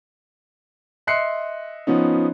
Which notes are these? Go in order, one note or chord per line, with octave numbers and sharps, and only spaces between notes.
D#5 E5 C6 F#6 C7 C#7
F3 B3 C#4 D#4